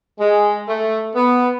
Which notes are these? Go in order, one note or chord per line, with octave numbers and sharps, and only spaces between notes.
G#3
A3
B3